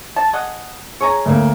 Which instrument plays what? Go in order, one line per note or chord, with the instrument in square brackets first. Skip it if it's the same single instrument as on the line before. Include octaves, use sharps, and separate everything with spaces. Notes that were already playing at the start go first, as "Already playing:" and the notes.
[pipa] A5
G#4 D#5 F#5
[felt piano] G#4 [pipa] C#5 G#5 A#5
[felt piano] D2 A#3